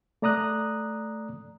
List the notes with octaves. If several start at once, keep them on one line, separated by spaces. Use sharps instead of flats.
A3 D5 A#5 D#6 F#6